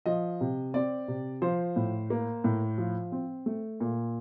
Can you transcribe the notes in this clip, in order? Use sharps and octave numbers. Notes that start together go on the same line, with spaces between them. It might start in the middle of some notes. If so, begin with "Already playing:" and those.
F3 D#5
C3
C4 D5
C3
F3 C5
A2
A#3
A2
F3
C4
A3
A#2